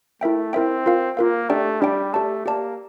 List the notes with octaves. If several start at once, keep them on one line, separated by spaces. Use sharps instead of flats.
A3 E4 A#4 E5 G5
C4 E4 A#4 E5 G5
F4 A#4 F5
A#3 F4 A#4 F5
A3 D4 G4 D5 G5
G3 D4 G4 D5 G5
A3 G4 D5 A5
A#3 G4 D5 A5